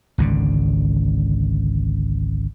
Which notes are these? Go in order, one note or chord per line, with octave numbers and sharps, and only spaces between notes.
G#1 C#2 D3